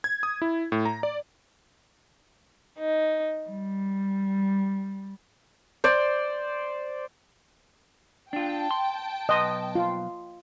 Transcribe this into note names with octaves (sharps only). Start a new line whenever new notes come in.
G#6
D#6
E4
A2
A#5
D5
D#4
G3
C5 D5
D4 F4 G5 A5
C6
B1 B4 D#5 C6
F4